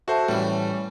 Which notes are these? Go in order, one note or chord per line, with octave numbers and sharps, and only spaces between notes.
F#4 A4 C5 E5 A5
A2 E3 G3 C#4